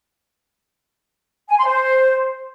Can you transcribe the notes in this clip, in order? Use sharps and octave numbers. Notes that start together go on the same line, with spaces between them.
G#5
C6
C5